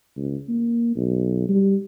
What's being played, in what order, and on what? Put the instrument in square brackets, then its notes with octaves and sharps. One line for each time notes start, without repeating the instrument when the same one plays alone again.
[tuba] C#2
A#3
B1
G3